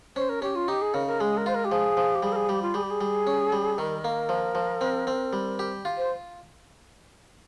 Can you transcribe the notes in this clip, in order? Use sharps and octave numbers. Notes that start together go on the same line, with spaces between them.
C#4 C5
A#4
C#4 G4
F4
D#4 G4
G#4
C#3 A#4
A#4
G#3 G#4
A#4
F4 C5
A#4
G4
F3 G#4
F3
G4
G3 G#4
A#4
G#4
G3 G4
F4
G3 G#4
G4
G#4
G3
C#4
G3
D#3 A#4
A#3
F3
F3
C4
C4
G3
G4
F4
C5